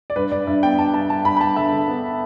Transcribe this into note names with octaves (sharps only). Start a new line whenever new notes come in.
D5
G2 B4
G2 D5
G2 E5
B3 G5
G2 A5
G2 A5
G2 A5
G2 B5
B5
G2 A5
D3 E5
D3
B3